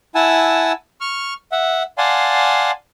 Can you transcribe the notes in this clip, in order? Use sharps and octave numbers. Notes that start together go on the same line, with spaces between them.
E4 F#5 G#5 A5 E6
C#6 F6
E5 F#5
D5 F5 F#5 G#5 A5 C6